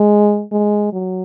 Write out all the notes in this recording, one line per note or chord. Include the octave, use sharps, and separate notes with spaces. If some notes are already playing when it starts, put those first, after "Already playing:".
Already playing: G#3
G#3
F#3